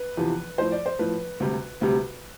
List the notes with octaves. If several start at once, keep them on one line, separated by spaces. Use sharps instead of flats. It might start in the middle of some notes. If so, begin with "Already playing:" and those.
Already playing: B4
E2 C3 F3
A2 F3 C5
D5
C5
A2 F3 B4
D2 C3 G3
D2 C3 G3